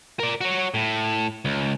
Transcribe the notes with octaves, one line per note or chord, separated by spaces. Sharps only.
A#4 D5
F#4 C#5
A2
C#2